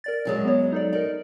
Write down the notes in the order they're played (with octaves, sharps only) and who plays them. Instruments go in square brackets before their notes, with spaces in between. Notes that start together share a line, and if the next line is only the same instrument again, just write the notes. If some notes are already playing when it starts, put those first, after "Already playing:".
[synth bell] A#4 D5 A6
[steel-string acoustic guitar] F#2 F#3 G#3
[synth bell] B3 C#5
D#4 A4 D5
[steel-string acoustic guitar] D#4 [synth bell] A#4 D5